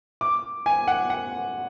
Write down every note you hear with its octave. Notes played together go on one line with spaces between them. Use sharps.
D6
G#5
F#5
F#5